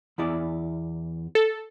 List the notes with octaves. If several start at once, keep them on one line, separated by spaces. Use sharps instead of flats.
E2 E4 D5
A4